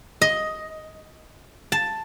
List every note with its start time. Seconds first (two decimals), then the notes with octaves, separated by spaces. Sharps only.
0.22 D#5
1.72 A5